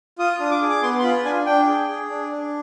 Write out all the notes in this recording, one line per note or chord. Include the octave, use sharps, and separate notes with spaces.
F4 D#6
D4 D#6
D6
G#4
D6
B3 C6
C6
F4 B5
D4 G#5
D4 G5
G#4
G#4
D4
D4